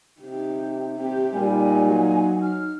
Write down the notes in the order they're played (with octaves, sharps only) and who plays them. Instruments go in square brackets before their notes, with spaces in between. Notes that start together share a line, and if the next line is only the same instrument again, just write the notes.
[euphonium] C3 [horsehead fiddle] D#4 G4
[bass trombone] C4 [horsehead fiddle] G4
[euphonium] A#2 [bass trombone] G3 [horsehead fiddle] D#4 [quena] G#5
[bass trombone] F#3
[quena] F6